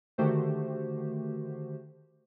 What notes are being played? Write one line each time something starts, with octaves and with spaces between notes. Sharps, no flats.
D3 D#3 A3 F#4 G4 C5